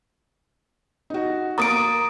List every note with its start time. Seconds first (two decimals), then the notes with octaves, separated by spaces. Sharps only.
1.10 D#4 F#4
1.58 A#3 A#5 D6 D#6 A6 D7